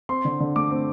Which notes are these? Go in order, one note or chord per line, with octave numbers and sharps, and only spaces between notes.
C4 C6
D3
D3
A3 D6
C4